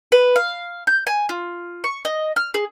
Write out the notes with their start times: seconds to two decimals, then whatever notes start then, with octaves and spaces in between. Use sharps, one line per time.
0.12 B4
0.36 F5
0.87 G6
1.07 G#5
1.29 F4
1.84 C#6
2.05 D#5
2.36 F6
2.54 G#4